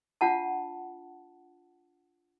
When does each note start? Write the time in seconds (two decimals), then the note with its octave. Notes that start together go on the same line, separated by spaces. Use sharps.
0.21 D4 F4 F#5 A5